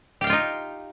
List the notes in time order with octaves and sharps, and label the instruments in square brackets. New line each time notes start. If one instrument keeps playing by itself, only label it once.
[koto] G4
F5
G5
F4
D#4